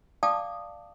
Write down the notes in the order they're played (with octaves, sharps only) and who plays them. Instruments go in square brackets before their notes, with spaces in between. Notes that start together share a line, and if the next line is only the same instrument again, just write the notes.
[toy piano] D5 F5 G5 A5 D6 D#6